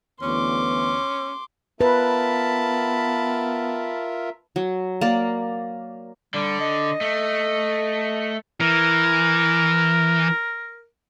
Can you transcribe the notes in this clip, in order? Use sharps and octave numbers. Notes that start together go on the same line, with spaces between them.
D2 E3 B3 C#4 C6 D6
B3 F4 A#4 B4 E5 A5 B5
F#3
A#3 D5
D3 G3
D#5
A3
E3 A#4